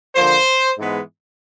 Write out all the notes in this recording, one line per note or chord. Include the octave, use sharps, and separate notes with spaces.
D3 F3 A#3 C5
G#2 E3 G#3 B3